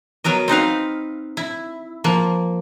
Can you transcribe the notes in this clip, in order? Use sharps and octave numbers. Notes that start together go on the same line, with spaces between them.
F#3 B3 A#4 D#5
C4 D#4 B4 F5
E4
F3 A#3